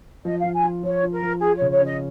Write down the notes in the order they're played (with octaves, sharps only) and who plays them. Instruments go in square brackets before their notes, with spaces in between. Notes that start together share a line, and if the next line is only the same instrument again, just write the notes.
[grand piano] F3 [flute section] D#5
[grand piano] F3 [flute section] F5
[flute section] G#5
[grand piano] F4
[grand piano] F3 [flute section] C#5
[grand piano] F4
[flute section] A#4
[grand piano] F3
[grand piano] F4 [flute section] G#4
[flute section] C#5
[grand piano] C#3
[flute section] C#5
[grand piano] C#4 [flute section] D#5